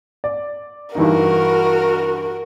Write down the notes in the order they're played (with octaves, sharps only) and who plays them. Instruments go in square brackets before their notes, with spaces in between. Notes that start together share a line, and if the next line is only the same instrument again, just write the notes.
[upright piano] D5
[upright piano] G2 E3 D#4 [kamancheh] F#4 A#4